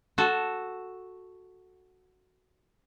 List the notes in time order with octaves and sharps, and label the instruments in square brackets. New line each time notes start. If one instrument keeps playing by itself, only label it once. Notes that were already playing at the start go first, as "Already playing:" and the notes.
[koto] F#4 A4